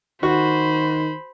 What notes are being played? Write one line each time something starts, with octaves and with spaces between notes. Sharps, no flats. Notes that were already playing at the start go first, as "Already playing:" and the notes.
D#3 F#4 C5 B5